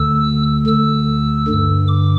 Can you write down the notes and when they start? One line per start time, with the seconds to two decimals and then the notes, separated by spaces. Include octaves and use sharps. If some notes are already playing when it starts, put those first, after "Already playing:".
Already playing: D2 D3 E6
0.66 D2 D3 E6
1.47 G2 D3
1.88 D6